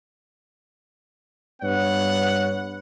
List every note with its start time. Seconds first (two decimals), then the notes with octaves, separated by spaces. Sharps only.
1.63 G2 B3 C#5 F#5